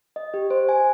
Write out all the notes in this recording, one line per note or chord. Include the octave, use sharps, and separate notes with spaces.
D#5
G4
C5
G#5